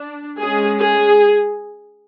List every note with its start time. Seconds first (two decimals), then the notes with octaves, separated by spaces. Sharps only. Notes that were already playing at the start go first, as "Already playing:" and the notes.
Already playing: D4
0.39 G#3 C#4 G#4
0.78 G#4